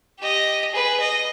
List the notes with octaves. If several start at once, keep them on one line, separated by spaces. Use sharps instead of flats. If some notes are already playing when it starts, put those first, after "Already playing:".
G4 D#5
G#4 B4
D#5